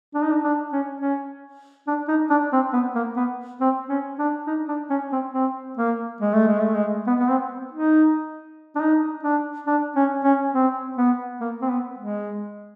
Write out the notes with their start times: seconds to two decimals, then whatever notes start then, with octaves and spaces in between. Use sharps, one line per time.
0.14 D4
0.23 D#4
0.32 D4
0.43 D4
0.72 C#4
1.01 C#4
1.87 D4
2.08 D#4
2.30 D4
2.53 C4
2.73 B3
2.95 A#3
3.17 B3
3.61 C4
3.89 C#4
4.19 D4
4.47 D#4
4.68 D4
4.90 C#4
5.12 C4
5.33 C4
5.77 A#3
6.21 G#3
6.34 A3
6.48 G#3
6.61 A3
6.75 G#3
7.07 B3
7.20 B3
7.29 C4
7.72 D#4
8.75 D4
8.80 D#4
9.23 D4
9.67 D4
9.96 C#4
10.24 C#4
10.54 C4
10.97 B3
11.40 A#3
11.61 C4
11.69 B3
11.98 G#3